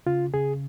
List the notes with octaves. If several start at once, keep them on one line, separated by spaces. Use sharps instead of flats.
C#3 F4
C#3 G#4